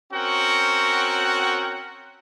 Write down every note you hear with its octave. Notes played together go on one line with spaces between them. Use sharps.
C4 C#4 F#4 A#4 F#5 G5